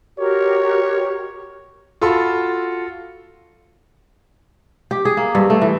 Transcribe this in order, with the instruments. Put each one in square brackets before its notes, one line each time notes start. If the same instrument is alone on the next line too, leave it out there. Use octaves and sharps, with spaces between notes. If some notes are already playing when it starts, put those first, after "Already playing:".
[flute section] F#4 G4 A#4 [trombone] C#5
[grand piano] F4 F#4 A4 B5 C6 E6
[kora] G4
G#4
A#3
G2
A3
E3